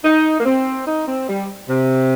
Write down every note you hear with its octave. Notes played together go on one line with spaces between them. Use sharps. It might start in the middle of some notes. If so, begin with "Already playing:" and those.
D#4
A#3
C4
D#4
C4
G3
C3